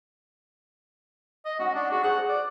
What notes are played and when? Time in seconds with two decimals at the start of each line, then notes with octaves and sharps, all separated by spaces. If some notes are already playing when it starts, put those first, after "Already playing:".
1.45 D#5
1.59 C#4 D#4 F#4 F#5
1.75 D4
1.91 F#4 G#4
2.03 G#4 C5 F#5
2.29 D5